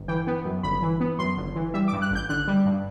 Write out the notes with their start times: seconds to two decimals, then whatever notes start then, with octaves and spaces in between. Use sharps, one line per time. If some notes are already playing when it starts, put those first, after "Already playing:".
Already playing: G1
0.08 E3 G5
0.27 B3
0.45 F#2
0.63 G1 B5
0.82 E3
1.00 B3
1.19 F#2 C6
1.37 G1
1.56 E3
1.74 G3 E5
1.88 D6
1.93 G2
2.02 F#6
2.11 A1 G6
2.29 D3 F#6
2.48 G3
2.65 G2